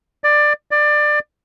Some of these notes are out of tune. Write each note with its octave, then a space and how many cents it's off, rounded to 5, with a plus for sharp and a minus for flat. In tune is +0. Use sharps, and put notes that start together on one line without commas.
D5 +15
D5 +20